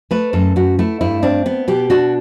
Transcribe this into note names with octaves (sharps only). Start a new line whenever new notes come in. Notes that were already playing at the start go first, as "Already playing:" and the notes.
A3 B4
F#2 A4
F#2 F#4
A3 E4
G2 E4
C4 D4
B3
B2 G4
D4 F#4